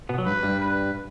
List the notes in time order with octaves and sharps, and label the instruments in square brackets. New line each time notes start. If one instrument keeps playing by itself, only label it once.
[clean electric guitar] B2 B3
F#3
[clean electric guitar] G2 G3 [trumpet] B4
[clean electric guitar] G2 G3
[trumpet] B4